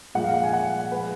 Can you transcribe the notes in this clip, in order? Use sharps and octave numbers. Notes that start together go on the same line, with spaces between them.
A#2 F3 G#3 F#5
F5
F#5
G#5
F#5
F3 G#3 B4